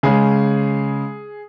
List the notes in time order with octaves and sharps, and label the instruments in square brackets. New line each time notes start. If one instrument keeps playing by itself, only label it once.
[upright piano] C#3 G#3 G#4